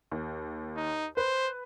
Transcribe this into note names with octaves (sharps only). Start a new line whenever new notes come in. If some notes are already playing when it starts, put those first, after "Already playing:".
D#2
D#4
B4 C5